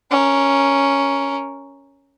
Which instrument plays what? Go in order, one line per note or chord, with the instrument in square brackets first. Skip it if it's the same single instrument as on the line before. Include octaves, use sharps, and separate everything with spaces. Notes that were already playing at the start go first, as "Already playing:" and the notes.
[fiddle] C#4 A#4